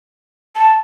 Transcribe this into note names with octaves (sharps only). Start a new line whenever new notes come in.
A5